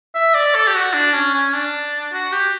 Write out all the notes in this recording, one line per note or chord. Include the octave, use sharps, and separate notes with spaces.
E5
D5
A4
G4
F#4
D4
C#4
C#4
D4
F#4
G4